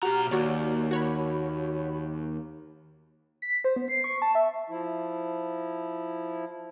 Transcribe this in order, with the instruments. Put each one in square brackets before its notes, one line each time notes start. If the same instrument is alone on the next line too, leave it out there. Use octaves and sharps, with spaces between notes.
[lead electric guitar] B2 A#5 [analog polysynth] F#4 G4 F6
[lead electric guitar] D#2 [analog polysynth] F#4 C#5 D5
[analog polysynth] F#4 C#5 B5
[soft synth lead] B6
C5
B3
C7
C#6
A5
E5
[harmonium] F3 E4